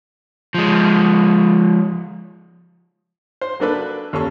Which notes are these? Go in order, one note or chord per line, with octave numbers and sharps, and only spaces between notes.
F3 G#3
C5
F#3 A#3 D4 A4 B4 D5
D#2 C#4 A4 D5 C#6